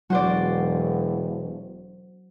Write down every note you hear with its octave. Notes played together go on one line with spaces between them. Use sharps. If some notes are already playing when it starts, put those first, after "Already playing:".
E1 F#3 F#4 C5 D5